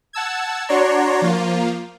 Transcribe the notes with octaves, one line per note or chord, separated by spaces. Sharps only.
F#5 A5 E6 G#6
D4 F#4 C#5 D5 A#5 C6
F3 A#3 F4